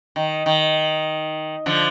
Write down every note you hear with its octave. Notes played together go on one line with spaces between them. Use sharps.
D#3
D#3
D3 F3